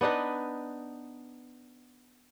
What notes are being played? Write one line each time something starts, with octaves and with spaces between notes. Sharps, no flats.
B3 D4 D#4 B4